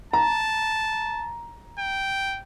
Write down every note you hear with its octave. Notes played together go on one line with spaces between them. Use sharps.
A5 A#5
G5